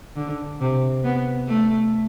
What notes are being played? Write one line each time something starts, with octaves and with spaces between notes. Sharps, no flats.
D3
C3
B3
A3